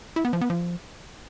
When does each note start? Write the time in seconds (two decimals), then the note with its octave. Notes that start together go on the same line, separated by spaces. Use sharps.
0.16 E4
0.25 B3
0.33 F3
0.41 B3
0.50 F3